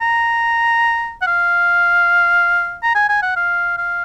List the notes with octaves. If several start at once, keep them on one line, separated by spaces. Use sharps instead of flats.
A#5
F#5
F5
A#5
G#5
G#5
F#5
F5
F5